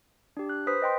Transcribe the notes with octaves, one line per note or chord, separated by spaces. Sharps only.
D4 G4
F#6
B4 C5 D#6 B6
D#5 G5 C6